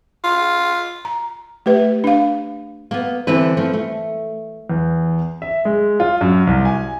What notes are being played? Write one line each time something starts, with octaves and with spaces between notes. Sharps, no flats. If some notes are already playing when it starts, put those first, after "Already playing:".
F4
A#5
A3 G4 B4 E5
D4 F5
A#3 B3
D3 E3 C4 B4
F3 A3 C4
A3
E2
E5
G#3
F4
F#2
C2
G#5